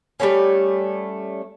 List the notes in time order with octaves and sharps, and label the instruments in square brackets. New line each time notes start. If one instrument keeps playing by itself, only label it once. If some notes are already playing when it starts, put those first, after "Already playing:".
[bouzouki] G3 A3 A#3 C#4